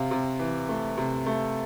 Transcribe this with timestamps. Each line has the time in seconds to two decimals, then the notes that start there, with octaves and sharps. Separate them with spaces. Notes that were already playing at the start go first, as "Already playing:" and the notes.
Already playing: C3 F5
0.11 C3
0.39 E3
0.69 A3
0.97 C3
1.26 A3